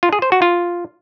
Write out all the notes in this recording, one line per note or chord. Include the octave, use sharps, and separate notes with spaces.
F4
G#4
C5
F#4
F4